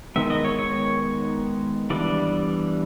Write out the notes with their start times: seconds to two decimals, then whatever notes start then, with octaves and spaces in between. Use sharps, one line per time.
0.16 D#3 G#3 B3 E5
0.30 D#5
0.45 C#5
0.59 C#5
1.90 E3 G3 B3 D4 D5